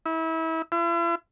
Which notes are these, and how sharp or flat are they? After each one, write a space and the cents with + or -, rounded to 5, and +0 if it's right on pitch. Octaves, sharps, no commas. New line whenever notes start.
E4 -30
E4 +45